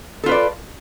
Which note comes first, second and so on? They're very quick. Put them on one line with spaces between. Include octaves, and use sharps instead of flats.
A4 F4 B4 D5